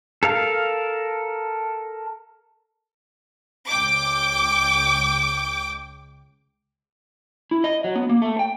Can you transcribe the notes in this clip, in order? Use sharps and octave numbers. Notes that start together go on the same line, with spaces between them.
A4 A#4 F5
C#2 G5 D6
E4
D#5
F#3
B3
A#3
A3
G5